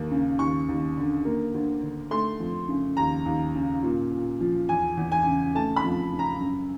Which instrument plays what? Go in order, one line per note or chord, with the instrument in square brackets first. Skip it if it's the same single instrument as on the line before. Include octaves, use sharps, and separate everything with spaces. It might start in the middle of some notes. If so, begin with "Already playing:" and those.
Already playing: [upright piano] D#2 A#3
C#3
D#2 C#6
D#2
D3
A#3
D2
D3
A3 C6
F2
C#3
D#2 A#5
D#2
C#3
A#2
A#2
F3
E2 G#5
E2
G#5
C#3
A3 A5
B5
F2
C#3
A#5
F#2